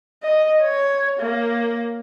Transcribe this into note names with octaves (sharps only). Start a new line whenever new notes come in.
D#5
C#5
A#3